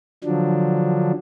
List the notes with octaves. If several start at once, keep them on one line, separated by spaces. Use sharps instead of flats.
D3 F3 F#3 D4